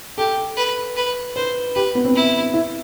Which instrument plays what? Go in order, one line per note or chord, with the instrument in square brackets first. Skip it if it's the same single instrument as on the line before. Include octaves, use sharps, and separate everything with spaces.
[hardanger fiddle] G4 [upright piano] A4
[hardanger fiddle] B4
B4
[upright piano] B4 [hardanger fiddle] C5
[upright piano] G4 [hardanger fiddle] B4
[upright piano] B3
C4
[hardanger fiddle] E4
[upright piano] E4